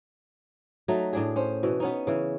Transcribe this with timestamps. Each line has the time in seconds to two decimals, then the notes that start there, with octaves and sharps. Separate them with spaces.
0.88 F#3 A3 D#4
1.13 A2 D4 G#4
1.36 C#4 C5
1.63 B2 E3
1.80 B3 C#4 D#4
2.07 C#3 E3